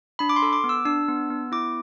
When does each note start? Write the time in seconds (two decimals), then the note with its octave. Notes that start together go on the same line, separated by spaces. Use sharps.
0.19 D4 B5
0.29 D6
0.36 C6
0.42 A4
0.53 D6
0.64 B3
0.69 E6
0.85 D4 E6
1.09 B3
1.30 B3
1.52 E4 D6